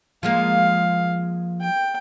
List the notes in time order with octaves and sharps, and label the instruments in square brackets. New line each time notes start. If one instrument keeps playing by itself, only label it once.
[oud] F3 G#3 A#3 [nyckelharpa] F5
[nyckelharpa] G5